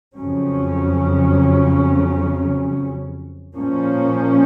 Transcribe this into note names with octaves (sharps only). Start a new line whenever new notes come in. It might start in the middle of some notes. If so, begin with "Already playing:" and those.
F2 C#3 F#3 C#4
A#2 F3 A#3 C#4